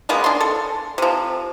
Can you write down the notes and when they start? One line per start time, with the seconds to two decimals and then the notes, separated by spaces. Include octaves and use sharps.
0.09 D#3 G#3 A#3 B3
0.24 D4 C6
0.41 A4
0.98 C3 F3